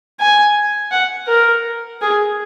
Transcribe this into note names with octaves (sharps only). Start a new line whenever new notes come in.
G#5
F#5
A#4
G#4